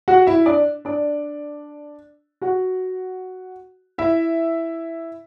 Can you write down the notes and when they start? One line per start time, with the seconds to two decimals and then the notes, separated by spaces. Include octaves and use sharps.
0.08 F#4 F#5
0.27 E4 E5
0.46 D4 D5
0.85 D4 D5
2.42 F#4 F#5
3.98 E4 E5